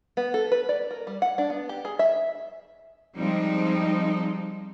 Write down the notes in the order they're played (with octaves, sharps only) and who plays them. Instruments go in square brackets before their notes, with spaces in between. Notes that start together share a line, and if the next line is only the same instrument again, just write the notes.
[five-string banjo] B3
A4
B4
D5
A#4
G3
F#5
D4
B3
G4
G#4
E5
[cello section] F3 G3 G#3 C4 D#4